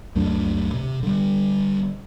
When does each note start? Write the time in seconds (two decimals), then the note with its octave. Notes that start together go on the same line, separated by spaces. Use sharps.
0.15 C#2 F#2 A3 D4
0.74 C3
1.03 D3 G3